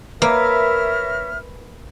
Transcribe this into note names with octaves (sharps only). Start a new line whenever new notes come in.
A#3 A#4 B4 C#5 E5 F6